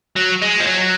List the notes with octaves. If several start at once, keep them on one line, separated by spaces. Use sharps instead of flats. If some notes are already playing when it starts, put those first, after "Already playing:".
F#3
G#3
F3
F#3